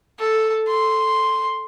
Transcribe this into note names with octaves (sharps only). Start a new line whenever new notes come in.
A4
C6